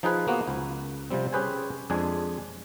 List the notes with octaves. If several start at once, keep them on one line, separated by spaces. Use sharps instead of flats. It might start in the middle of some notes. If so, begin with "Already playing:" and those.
F3 D#4 F4 G#4 B4
A#3 B3 F#4
C#2
C3 F3 G3 C4
C#4 G4 G#4 B4 C5 G#5
F2 G#3 D4 G#5